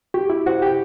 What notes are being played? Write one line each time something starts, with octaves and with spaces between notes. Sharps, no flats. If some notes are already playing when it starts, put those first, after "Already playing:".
F#4 G4
E4
F#4 C5 F#5
G4